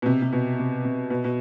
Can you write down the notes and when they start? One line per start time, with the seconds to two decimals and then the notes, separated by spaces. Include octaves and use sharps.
0.02 B2
0.06 C3
0.22 C3
0.33 B2
0.59 C3
0.85 C3
1.10 B2
1.24 B2